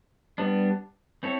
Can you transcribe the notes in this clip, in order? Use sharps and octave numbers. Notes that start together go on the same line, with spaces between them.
G3 B3 D4
C4 E4 A4 C#5